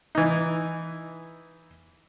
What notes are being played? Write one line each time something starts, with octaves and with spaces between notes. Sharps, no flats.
E3 D#4